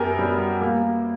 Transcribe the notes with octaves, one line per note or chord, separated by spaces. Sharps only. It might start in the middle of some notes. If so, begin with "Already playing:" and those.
Already playing: F#2 B3 G4 A#4
G3
A#3